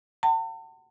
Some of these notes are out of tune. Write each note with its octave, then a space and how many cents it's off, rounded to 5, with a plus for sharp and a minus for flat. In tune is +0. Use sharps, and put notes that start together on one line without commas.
F#5 +30 A5 +40